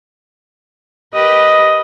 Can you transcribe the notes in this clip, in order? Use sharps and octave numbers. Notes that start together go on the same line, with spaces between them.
G4 A#4 B4 D#5